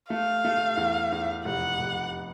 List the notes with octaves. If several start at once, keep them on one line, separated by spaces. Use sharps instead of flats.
A3 F5
A3
E2
E2
F1 F#5
F1